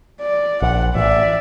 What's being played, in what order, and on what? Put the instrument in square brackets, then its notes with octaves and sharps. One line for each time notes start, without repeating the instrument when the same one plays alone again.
[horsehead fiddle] D5
[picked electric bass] A#1 [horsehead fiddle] F#5
[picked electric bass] A1 [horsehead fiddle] D5 E5